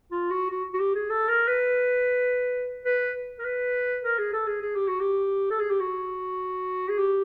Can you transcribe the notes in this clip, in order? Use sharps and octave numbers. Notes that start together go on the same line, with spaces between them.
F4
F#4
F#4
F#4
G4
G#4
A4
A#4
B4
B4
A#4
B4
A#4
G#4
A4
G#4
G#4
G4
F#4
G4
A4
G#4
G4
F#4
G#4
G4